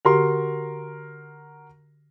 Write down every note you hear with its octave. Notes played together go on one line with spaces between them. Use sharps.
D3 F#4 G4 A#4 C6